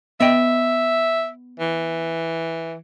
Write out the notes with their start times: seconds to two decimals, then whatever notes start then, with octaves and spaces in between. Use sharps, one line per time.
0.20 B3 D#5 E5 G5
1.60 E3